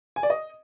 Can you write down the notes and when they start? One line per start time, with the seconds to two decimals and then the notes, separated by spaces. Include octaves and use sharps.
0.16 G#5
0.23 D5
0.30 D#5